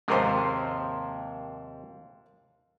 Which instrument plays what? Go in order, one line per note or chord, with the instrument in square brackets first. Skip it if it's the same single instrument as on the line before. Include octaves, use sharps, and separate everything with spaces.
[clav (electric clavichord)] D#2 C3 F3 [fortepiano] G#2 A#4 C5